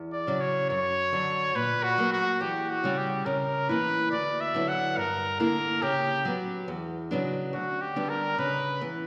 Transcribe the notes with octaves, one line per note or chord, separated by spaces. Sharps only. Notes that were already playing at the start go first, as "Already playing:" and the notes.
Already playing: E2
D5
C#3 F#3
C#5
F#2 C#5
D3 F#3
A#2 B4
F#4
F#3 A#3
F#4
E2 G4
F#4
C#3 G3
G4
C#3 A#4
E3 A#3 E4 B4
D2 D5
E5
D3 F#3 B3 E4
F#5
G2 A#4
D3 A#3 E4 A#4
C#3 G4
F#3 B3
E2
C#3 F#3 B3 D4
D2 F#4
G4
D3 G3 B3 D4
A#4
C#3 B4
E3 B3